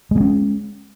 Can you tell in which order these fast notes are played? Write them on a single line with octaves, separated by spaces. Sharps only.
G#3 A#3 C#4